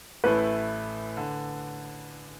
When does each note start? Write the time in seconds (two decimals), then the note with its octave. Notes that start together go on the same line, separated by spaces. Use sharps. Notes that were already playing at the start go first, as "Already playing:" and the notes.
0.24 A1 A2 A3 E4 B4
1.17 D3